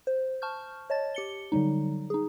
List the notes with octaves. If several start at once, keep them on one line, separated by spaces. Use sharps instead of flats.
C5
A5 C#6 F6 G6
C#5 D#5 A5 A6
G4 C#7 G7
D3 F#3 G3 D#4
D#4 G#4